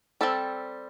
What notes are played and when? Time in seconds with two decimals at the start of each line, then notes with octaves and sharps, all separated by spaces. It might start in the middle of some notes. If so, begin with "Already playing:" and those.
0.21 G3 C4 A4